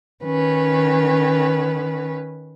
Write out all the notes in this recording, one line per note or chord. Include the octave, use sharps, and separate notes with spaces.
D#3 C#4 B4